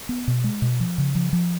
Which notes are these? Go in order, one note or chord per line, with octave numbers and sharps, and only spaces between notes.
B3
B2
G#3
B2
F3
C#3
F3
F3